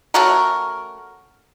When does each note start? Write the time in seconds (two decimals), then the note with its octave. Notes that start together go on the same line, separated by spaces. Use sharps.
0.14 A3 C#4 F#4 A#4